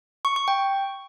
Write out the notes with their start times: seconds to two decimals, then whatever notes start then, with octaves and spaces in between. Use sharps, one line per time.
0.25 C#6
0.36 C#6
0.48 G5